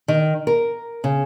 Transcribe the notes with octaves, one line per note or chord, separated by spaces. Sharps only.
D#3
A#4
C#3